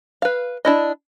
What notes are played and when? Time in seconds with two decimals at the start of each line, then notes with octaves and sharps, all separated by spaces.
0.22 B4 F5
0.65 D4 E4 D#5